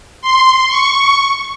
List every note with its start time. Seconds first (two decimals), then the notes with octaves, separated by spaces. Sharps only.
0.22 C6
0.69 C#6